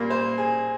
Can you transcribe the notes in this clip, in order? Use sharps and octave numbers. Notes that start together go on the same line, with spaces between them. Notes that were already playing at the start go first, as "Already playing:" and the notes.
Already playing: A#2 G3 A#3
C5
G#4